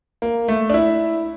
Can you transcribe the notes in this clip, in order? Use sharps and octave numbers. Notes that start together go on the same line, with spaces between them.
A#3
A3
D4
E4